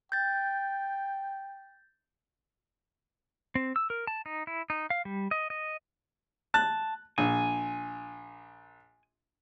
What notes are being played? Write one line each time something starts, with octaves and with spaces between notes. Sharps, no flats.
G5 G6 A6
C4
E6
A#4
A5
D#4
E4
D#4
F5
G3
D#5
D#5
A5 F#6
A#1 G#5